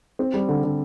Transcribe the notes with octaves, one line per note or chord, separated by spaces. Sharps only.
C4
G3
D3
D3